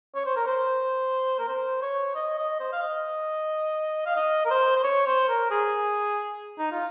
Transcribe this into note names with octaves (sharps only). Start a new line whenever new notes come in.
C#5
C5
A#4
C5
A#4
C5
C#5
D#5
D#5
C5
F5
D#5
F5
D#5
A#4
C5
C5
C#5
C5
A#4
G#4
D#4
F4